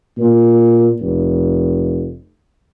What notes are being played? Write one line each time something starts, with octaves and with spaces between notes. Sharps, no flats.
A#2
F1